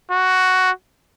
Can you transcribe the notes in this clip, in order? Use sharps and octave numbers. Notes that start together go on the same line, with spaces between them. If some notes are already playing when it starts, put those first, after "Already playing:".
F#4